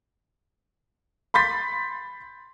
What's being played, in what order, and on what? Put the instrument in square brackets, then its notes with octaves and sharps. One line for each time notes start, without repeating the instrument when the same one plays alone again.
[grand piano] B5 C6 G6 A6 B6